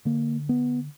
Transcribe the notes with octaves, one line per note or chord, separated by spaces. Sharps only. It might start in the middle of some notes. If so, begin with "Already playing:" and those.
D3 A#3
B3